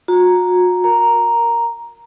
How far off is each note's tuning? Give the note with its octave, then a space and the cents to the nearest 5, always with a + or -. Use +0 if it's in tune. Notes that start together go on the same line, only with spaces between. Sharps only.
F#4 -40 A#5 +0
A#4 +0 A#5 +0